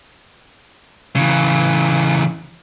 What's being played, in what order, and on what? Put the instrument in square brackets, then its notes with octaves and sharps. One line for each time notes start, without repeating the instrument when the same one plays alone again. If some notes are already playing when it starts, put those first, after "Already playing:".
[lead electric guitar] C#3 E3